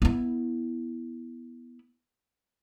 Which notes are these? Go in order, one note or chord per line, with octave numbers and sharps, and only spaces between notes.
B3 E4